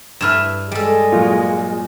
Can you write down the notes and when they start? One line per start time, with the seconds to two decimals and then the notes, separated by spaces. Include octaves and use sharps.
0.21 G2 E4 B4 F6 E7
0.72 G3 G#3 A4
1.12 A#2 F#3 F4